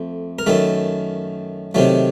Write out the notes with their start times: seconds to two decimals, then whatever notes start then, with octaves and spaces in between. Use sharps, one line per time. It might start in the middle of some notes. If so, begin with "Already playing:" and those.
Already playing: F2 A3
0.39 A#4
0.47 F#2 D#3 A3 A4
1.75 C3 D#3 F#3 A3